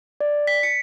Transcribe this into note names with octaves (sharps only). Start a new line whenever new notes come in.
D5
B6
C#7